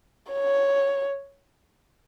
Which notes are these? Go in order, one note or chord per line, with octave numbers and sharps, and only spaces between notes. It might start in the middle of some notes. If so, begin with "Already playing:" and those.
C#5